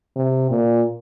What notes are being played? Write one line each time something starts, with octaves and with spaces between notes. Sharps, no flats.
C3
A#2